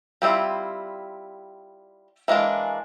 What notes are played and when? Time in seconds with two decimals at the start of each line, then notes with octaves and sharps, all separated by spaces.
0.22 G3 C4 E4 F4
2.28 E3 G#3 A#3 D4